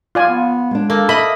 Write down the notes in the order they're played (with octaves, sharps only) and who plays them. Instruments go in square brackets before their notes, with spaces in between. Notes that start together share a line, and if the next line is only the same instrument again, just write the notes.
[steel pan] F4 D5 G#5
[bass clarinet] B3
[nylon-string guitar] G#3 D4
[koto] A#3 [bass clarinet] A4
[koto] D#5 [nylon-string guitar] E5 [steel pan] B5